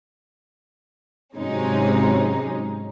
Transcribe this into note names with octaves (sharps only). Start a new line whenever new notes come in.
G#2 C3 F#3 G#3 C#4 D#4